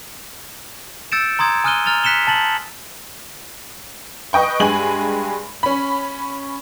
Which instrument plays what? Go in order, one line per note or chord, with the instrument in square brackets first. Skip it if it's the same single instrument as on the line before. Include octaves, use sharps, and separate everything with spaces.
[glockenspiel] E6 G6 A6 C#7 D7 E7
A#5 C6 D#6 G#6
G#5 D#6 F6 F#6 D#7 G7
A#5 F6 A6 F7 G7
F#6 B6 C#7 E7 G7
A5 A6 F#7
[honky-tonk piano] B4 D#5 G5 C#6
G2 G#3 G4 G#5 F#7
C#4 B5